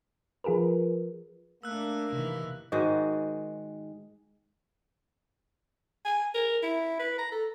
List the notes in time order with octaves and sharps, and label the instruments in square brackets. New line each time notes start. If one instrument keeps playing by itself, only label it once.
[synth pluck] F3 F4 G#4 A#4 B4
[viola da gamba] A3 D4 [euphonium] A#3 [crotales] E6 F#6
[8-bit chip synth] C3 [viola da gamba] D#3 E3
[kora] G#2 D#3 G#3 F#4
[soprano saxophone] G#5
A#4
E4
B4
A#5
A4